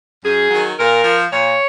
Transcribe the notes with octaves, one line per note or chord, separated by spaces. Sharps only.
F#2 G#4
D#3 F#3
A#2 A#4
F3
A#2 C#5